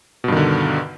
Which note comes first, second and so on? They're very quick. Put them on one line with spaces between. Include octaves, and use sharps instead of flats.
B2 G2 D#3 D3